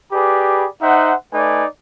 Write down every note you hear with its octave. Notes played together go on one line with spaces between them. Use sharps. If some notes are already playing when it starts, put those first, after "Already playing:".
G4 G#4 B4 D5 B5
D#4 C5 E5 F#5
A3 D#4 B4 D5 G#5